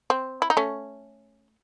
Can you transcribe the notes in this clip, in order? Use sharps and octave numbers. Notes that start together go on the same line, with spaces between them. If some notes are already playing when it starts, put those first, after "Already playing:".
C4
E4
D#4
A3 C#4